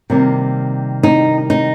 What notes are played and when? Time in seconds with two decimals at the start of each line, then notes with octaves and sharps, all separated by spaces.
0.10 C3 D#3 G3 A#3
1.03 D#4
1.50 D#4